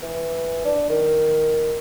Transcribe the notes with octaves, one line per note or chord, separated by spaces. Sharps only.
E3
D4
D#3